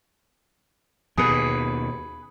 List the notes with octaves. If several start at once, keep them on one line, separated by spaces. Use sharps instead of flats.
D#2 B2 G#4 B4